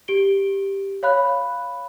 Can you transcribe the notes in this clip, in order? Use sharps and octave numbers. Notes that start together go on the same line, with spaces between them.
G4 D7 G7
C#5 F5 B5 F#6